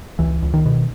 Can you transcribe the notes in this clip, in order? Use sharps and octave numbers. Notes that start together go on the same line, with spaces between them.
C#2 E3
C#2
D#3
B2